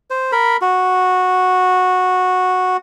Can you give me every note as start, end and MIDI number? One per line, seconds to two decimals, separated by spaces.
0.10 0.31 72
0.32 0.57 70
0.32 0.57 83
0.61 2.77 66